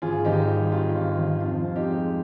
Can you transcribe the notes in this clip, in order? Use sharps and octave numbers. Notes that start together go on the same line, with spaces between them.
G#1 F4 G#4
G#1 D#4 G4
G3
G2 F4
G#1
G#1
F2 F4
F2
D#4 G4
G#3